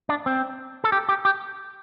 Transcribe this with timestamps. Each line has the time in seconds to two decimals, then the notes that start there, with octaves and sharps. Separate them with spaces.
0.09 D4
0.26 C4
0.84 A4
0.92 G4
1.09 G4
1.25 G4